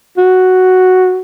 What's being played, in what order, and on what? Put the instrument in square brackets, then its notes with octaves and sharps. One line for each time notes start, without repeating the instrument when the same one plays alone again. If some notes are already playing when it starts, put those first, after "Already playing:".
[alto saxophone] F#4